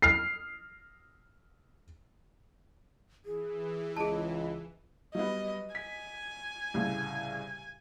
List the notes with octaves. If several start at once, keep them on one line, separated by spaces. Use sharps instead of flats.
F6 C7
E3 G#4
C#2 G#4 D#5 A5
F#3 G3 B3 D#5
G#5 B6
C2 A2 C#3